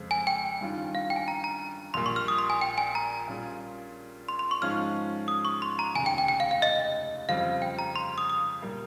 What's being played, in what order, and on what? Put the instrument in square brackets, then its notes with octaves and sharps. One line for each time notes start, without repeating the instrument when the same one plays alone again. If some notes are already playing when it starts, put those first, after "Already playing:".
Already playing: [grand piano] F2 C#3 G#3 C4
[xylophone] G#5
G5
[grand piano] G2 D#3 G3 C#4 F4
[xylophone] F5
G5
G#5
A#5
A#5
[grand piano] A#1 A#2 G3 [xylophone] C6
[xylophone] C#6
F6
D#6
C6
G#5
G5
G#5
A#5
[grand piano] A#2 G3 C#4 F4 G#4
[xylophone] C6
C6
C#6
[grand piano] G#2 F3 G#3 C#4 F4 [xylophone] F6
[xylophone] D#6
C#6
C6
A#5
[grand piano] F1 D#2 C#3 [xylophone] G#5
[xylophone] G5
G5
G5
F5
F5
D#5
[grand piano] F2 C#3 G3 C4 F4 [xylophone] F5
[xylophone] G5
A#5
C6
D#6
D#6
[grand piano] A#2 G3 A#3